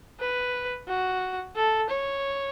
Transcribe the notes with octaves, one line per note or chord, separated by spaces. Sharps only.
B4
F#4
A4
C#5